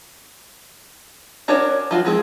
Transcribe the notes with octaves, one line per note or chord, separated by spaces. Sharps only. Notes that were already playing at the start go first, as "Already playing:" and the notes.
C#4 D4 F#4 A#4 C#5
F3 F4 F#4
F3 G#3 C4 G#4